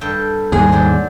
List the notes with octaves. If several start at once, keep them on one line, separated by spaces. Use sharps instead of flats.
G2 A4 G5
D#2 G#2 G3 G#4 G#5
F#3 C5 D5